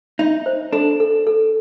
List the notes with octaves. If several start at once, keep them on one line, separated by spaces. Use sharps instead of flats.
D#4 E5
C5
D4 A4
A4
A4